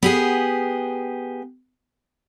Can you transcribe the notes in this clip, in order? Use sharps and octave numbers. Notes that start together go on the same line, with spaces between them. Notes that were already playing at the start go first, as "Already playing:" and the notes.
B3 G4 G#4